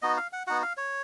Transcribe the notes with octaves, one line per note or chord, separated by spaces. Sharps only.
B3 D#4 F#4 D#5
F5
F#5
B3 D#4 F#4 F#5
F5
C#5